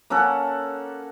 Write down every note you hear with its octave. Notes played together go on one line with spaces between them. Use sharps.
A#3 C#4 A4 F#5